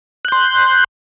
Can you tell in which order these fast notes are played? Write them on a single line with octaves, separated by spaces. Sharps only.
F#6 G6 C6